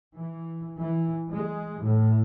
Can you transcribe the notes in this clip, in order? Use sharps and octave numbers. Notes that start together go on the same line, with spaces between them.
E3
E3
G#3
A2